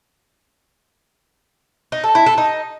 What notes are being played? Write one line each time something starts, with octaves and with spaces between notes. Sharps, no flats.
D#4
A4
E4
A4
D#4